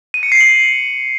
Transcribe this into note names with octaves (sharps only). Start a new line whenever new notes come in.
D#7
C#7
C7
F#7